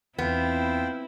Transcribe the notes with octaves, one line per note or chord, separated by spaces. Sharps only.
E2 B3 C4 E4 F4 G5